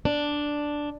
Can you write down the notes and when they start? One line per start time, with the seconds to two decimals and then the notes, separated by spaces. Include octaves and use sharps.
0.05 D4